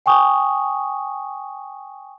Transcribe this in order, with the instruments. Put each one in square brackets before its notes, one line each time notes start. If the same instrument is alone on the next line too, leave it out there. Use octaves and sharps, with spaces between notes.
[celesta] G5 G#5 C#6 D#6